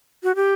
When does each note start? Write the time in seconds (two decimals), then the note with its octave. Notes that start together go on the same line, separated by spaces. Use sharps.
0.23 F#4
0.35 G4